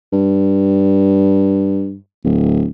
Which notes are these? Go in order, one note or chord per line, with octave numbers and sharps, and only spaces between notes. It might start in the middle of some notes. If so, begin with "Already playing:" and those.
G2
D1